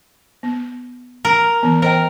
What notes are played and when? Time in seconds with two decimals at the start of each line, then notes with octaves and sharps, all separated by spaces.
0.43 B3
1.25 A#4
1.63 E3 B3
1.82 A#4 C5 D#5 G5